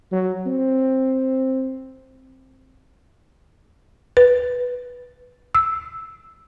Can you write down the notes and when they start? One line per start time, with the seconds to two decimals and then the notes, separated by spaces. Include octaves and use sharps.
0.12 F#3
0.46 C4
4.17 B4
5.55 E6